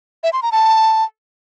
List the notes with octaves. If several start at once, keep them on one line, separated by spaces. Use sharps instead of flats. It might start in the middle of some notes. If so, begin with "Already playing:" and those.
E5
C6
A#5
A5